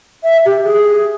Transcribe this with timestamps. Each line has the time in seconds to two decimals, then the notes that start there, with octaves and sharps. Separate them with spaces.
0.23 E5
0.45 G4
0.65 G#4